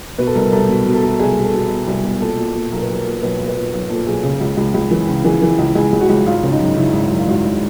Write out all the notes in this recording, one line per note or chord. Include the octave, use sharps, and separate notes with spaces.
B2 B4
A4
C2 A#4
C2 A4
B2
B2
A4
B2
C2 G#4
B2
A4
B2
B2
C2
B2
A#2 A4
A#2
A#2
B1 A#4
B4
B1 A#4
A#2
B1 B4
B1
B4
A#2
B1
A#2 A4
B1 G#4
C#3
C#2
C#2
C#2
E3
C#3
E3 G#4
E3
C#2
C#2 G#4
C#2
F#4
C#2
G#1 F4
C#3
D#4
F#2
C#3 E4
G#1
F#2
F4
G#1 F#4
G#1